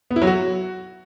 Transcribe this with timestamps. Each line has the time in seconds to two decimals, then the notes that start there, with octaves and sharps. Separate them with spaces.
0.11 B3
0.16 E4
0.22 F#3
0.27 F#4